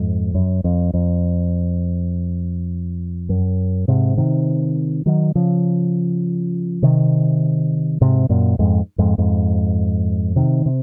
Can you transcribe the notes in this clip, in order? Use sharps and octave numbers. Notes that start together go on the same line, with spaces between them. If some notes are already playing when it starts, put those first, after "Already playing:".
Already playing: F2 G#2
F#2
F2
F2
F#2
G#2 C3
C3 D#3
D#3 F#3
C#3 F3
C3 D#3
G#2 C3
F#2 A#2
F2 G#2
F2 G#2
F2 G#2
C3 D#3
C3